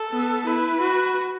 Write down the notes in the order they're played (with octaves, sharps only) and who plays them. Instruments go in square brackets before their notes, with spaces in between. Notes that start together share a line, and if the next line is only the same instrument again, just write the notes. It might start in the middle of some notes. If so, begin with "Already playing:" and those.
Already playing: [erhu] A4
[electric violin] B3
[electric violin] E4 [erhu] B4
[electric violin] F#4